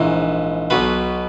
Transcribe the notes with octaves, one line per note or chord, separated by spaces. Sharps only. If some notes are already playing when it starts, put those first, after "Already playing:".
Already playing: A#1 G#2 E3
B1 B2 B4